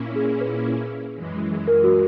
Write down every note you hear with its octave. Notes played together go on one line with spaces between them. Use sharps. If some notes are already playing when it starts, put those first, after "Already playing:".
Already playing: A#2 A#3 C#4 E4
G#4
B4
F#2 E3 G#3
A#4
F#4